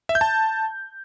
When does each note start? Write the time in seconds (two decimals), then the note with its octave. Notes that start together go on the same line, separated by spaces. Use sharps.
0.09 E5
0.15 G6
0.21 A5